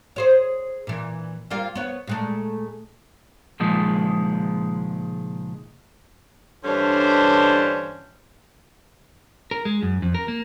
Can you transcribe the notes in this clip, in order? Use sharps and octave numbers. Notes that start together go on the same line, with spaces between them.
G#4 C5 C#5
A#2 E3
G3 A#3 F4
B3 C#5
A#2 G#3 A3
C#2 A#2 D#3 F3 G#3
G2 D3 E3 C#4 D4 C5
A#4
G#3
F#2
F2
A#4
A#3